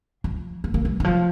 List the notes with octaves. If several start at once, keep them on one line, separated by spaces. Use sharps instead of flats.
F3
A#3
A#3
G3
D#3
F3